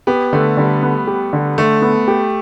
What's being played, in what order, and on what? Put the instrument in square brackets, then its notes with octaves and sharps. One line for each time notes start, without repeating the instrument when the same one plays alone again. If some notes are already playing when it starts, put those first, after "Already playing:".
[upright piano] B3 [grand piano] G4
[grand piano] D3 [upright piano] A3
[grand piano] D3 [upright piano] G3
[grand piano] B3
G4
D3
[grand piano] D3 [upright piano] A3
[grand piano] B3
G4